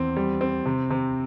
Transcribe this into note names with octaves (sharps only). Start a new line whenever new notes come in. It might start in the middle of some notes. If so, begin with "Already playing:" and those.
Already playing: E2 C4
G3
C4
C3
C3